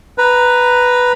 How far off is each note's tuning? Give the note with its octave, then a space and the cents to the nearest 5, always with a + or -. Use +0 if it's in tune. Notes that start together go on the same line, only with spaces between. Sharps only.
B4 +0 A#5 +0